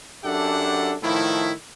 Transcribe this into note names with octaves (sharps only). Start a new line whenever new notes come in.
F#2 D4 G4 A4 E5 F#5
A2 D#3 F3 E4